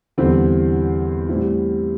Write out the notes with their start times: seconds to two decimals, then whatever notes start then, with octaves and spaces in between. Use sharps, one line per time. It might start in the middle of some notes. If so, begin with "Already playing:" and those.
0.18 E2 D3 G3 C4 E4
1.29 A2 G3 C4 E4